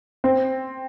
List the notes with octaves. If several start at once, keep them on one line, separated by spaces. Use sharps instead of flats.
C4